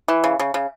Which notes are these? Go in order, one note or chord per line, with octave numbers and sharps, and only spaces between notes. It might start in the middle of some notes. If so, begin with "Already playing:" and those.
E3
C#3
C#3
C#3